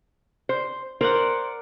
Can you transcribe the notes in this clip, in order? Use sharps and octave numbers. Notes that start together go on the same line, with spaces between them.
C5
A#4 C5 D5 F#5